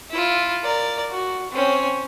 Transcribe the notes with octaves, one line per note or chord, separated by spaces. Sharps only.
E4 F4
A#4 D5
F#4
C4 C#4